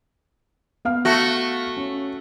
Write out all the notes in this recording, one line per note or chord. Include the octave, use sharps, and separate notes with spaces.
B3 F5 F6
A3 F#4
C#4